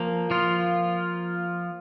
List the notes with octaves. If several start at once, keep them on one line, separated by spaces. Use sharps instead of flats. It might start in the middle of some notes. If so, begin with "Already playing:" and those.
Already playing: F3 A#3
F3 F4